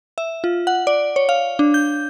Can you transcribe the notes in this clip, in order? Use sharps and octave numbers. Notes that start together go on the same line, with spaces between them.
E5
F4
F#5
D5
C#5
F5
D4
G6